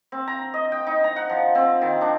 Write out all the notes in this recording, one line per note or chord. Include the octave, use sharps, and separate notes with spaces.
C4
A#5
D#5
G5
D#4
A#5
F#5
F3
C4
D#3
D4